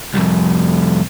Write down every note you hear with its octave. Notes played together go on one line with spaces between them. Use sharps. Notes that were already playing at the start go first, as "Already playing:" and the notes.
C2 F2